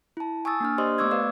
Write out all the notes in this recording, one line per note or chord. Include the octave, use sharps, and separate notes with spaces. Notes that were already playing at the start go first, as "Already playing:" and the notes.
E4 A5
G#5 C#6 D#6 E6 A6
A#3 D4 F6
G4 C5 D5 D#5 C6 D#6
A3 B3 C#6 D6 E6 G#6
B4 D5 F5